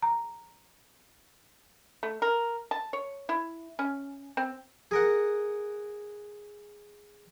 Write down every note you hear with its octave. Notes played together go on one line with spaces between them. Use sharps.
A#5
A3
A#4
A5
C#5
E4
C#4
C4
G#4 A#4 F#5